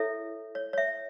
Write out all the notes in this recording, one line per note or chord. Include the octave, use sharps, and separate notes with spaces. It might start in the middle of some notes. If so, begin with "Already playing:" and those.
Already playing: E4 A4 C#5 E5
C#5
C#5
E5